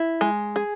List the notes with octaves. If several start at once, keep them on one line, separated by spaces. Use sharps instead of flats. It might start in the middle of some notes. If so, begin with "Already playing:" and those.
Already playing: E4
G#3
G#4